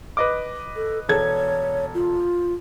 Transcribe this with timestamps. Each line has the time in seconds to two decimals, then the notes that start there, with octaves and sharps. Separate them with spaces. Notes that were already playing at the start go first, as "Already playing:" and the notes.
0.17 B4 D#5 D6
0.76 A4
1.09 E1 A4 C#5 G#6
1.94 F4